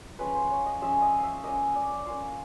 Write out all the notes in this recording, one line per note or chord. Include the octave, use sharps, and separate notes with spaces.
F3 G#3 C#4 F4 B4
C5
C#5
D#5
F3 G#3 C#4 F4 E5
D#5
E5 F5
A#3 C#4 F4 D#5
D5
A#3 C#4 F4 F5